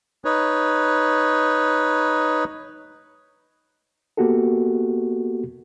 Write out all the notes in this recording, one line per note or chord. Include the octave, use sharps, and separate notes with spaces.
D#4 B4 C#5
A#3 B3 F#4 G4 A4